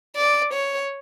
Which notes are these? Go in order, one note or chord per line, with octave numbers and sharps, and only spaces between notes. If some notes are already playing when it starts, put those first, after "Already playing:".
D5
C#5